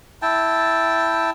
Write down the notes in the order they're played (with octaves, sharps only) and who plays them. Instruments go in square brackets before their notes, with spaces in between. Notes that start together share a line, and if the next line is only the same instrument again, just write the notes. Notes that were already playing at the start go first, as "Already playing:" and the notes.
[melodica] E4 G5 A5